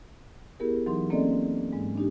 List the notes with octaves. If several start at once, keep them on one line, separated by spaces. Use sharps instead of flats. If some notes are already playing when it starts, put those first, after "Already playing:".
B3 E4 G4 G#4 A#4
E3 F#3 D#4 C6
A#3 C4 C#4 A4 D5 D#5
G#2 G#3
D4 D#4 G4